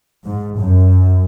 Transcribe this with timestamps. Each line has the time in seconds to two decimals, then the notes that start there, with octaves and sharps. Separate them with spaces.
0.25 G#2
0.58 F#2